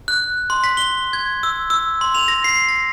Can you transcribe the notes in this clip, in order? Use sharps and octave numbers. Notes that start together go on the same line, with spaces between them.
F#6
C6
B6
G7
G#6
E6
E6
C6
F7
A#6
C7
A#6